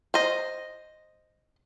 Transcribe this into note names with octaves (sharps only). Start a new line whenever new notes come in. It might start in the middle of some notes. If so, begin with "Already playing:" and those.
C5 D#5